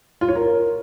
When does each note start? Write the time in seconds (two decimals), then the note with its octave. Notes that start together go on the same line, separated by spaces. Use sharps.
0.21 F4
0.28 C#5
0.36 A#4